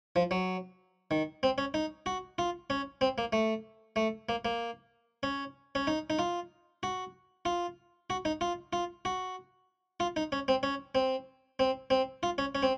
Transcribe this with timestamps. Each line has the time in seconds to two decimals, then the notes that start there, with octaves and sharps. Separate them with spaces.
0.16 F3
0.31 F#3
1.11 D#3
1.43 C4
1.58 C#4
1.74 D#4
2.06 F#4
2.38 F4
2.70 C#4
3.01 C4
3.18 A#3
3.33 A3
3.96 A3
4.29 A#3
4.45 A#3
5.23 C#4
5.75 C#4
5.87 D#4
6.10 D#4
6.19 F4
6.83 F#4
7.45 F4
8.10 F#4
8.25 D#4
8.41 F4
8.73 F4
9.05 F#4
10.00 F4
10.16 D#4
10.32 C#4
10.48 C4
10.63 C#4
10.95 C4
11.59 C4
11.90 C4
12.23 F4
12.38 C#4
12.55 C#4
12.63 C4